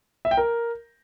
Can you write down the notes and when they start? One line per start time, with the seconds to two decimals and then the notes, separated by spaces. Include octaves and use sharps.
0.25 E5
0.31 G5
0.37 A#4